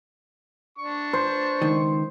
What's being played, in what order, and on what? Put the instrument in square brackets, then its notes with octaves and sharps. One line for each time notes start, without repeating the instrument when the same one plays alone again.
[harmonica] D4 C#6
[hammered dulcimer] C5
[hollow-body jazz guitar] C#2 D#3